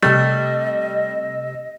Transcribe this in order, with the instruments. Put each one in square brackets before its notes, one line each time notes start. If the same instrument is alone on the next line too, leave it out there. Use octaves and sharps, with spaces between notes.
[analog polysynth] C3 E6 [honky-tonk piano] G3 [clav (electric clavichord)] A3 [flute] D#5